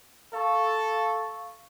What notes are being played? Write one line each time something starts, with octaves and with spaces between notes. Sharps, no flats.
A4 F5 C#6